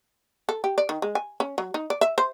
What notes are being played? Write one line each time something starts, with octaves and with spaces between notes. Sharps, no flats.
A4
G4
D5
D#3
G#3
G#5
C#4
F#3
D#4
D5
E5
C5